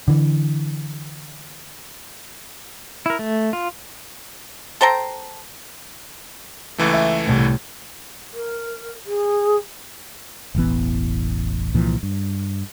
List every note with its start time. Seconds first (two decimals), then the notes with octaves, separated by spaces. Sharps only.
0.08 D3 E3
3.06 E4 A#4
3.19 A3
3.53 F4
4.81 A4 C5 G5 A#5
6.78 C#2 E3 A3
6.93 E5
7.26 C2 A2
8.33 A#4
9.06 G#4
10.55 E1 A1 E3 B3
11.74 C2 A#2 E3 F3
12.03 G2